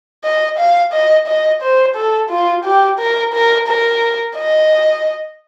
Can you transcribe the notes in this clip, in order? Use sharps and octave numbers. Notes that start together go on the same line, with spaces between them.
D#5
F5
D#5
D#5
C5
A4
F4
G4
A#4
A#4
A#4
D#5